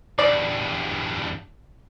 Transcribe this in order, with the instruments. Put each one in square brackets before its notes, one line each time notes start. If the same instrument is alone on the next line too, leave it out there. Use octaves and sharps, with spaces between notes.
[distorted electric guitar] E2 G2 [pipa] D5